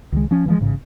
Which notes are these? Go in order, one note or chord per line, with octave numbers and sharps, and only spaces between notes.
C#2 D#3 G#3
F3 C#4
E3 F3 G#3
A1 G#2 C#3